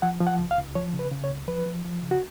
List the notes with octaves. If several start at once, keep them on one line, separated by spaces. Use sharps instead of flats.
F3 F#5
F3
F#5
C#2
F5
C#2
F3 C#5
C#3
B4
C#3
C#5
C#2
F3 B4
F3
F3
C#3
F#4